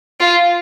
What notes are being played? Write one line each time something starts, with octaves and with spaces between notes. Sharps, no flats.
F4